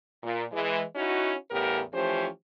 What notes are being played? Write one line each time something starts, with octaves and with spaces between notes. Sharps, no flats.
A#2
E3 G#3
C#4 D#4 E4 F#4
E2 A2 C#3 B3 G4 A#4
E3 F3 A3 C#4 G4 C5